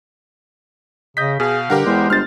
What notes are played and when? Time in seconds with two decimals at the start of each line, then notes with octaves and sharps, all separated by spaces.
1.17 C#3 D#5 G6 B6
1.40 B2 G#4 F5
1.70 G2 D3 G4 A#4 F#5
1.86 E2 G#3 C5
2.10 G1 C5 F6 A6